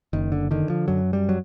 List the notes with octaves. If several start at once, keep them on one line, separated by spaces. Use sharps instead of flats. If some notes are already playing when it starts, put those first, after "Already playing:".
F#1 D#3
D3
D3 D#3
F3
F#2 F#3
G3
F#3